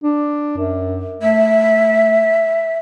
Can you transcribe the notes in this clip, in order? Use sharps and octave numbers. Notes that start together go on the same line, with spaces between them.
D4
F#2
A3 E5